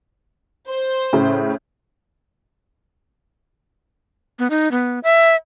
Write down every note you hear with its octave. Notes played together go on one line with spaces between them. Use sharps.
C5
A2 C#3
B3
D#4
B3
E5